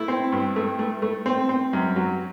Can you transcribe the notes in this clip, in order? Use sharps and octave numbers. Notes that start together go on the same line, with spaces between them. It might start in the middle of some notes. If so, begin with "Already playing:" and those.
Already playing: A3 E4
C4
G2
A3
A3
A3
C4
C4
F#2
F#3